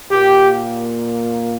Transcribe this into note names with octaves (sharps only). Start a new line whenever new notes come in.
A#2 A#3 G4